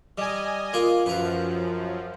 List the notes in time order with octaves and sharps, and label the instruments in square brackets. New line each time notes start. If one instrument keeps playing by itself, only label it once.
[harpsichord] G3 [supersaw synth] D#5 G#5
[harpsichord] A#3 F4 A#4
[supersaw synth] F#2 F3 [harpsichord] B4 A#5